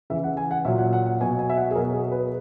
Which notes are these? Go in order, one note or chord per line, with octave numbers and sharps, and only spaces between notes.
C#3 E3 E5
F#5
G#5
F#5
A#2 F#3 E5
F#5
F#5
F#5
B2 F#3 G#5
G#5
E5
F#5
G#4
B2 F#3 A#4
G#4
B4